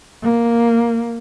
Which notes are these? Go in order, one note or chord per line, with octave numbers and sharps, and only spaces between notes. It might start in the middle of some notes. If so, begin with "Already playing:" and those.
A#3